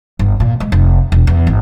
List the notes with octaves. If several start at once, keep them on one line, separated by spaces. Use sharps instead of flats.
G1
A#2
G#3
F1
E1
E2
G#1